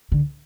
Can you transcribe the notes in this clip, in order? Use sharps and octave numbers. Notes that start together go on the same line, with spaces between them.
D3